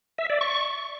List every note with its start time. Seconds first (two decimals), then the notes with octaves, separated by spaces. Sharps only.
0.18 E5
0.30 D5
0.41 C#6